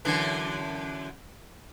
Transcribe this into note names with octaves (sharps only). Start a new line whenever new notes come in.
F#2 D3 E3